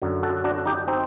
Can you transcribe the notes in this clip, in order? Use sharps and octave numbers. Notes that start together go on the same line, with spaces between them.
F#2 D3 F#3
F#4 A4
D4 F#4
D#4 G4
C4 D#4